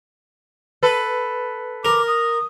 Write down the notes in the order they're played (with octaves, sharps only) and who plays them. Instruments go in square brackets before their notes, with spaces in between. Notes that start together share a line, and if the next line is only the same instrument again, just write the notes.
[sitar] A4 B4
[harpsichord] A#4 [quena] D6
[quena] D#6